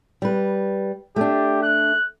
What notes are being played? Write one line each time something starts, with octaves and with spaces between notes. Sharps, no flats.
G3 B4
A3 D4 G4
F#6